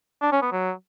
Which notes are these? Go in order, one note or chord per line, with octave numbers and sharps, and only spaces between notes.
D4
C#4
B3
F#3